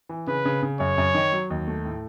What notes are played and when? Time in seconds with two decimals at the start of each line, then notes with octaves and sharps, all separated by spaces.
0.09 E3
0.27 C#3 B4
0.45 C#3
0.62 C#3
0.80 F#2 C#5
0.98 F#2
1.15 D#3
1.32 F#3
1.50 D#2
1.68 A3
1.85 A2